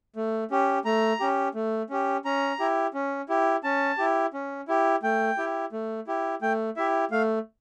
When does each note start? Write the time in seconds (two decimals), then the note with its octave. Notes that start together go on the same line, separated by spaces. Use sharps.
0.16 A3
0.51 C#4 G4
0.85 A3 A#5
1.20 C#4 G4
1.55 A3
1.90 C#4 G4
2.25 C#4 A#5
2.59 E4 G4
2.94 C#4
3.29 E4 G4
3.64 C#4 A5
3.98 E4 G4
4.33 C#4
4.68 E4 G4
5.03 A3 G5
5.38 E4 G4
5.72 A3
6.07 E4 G4
6.42 A3 G5
6.76 E4 G4 E5
7.11 A3 F5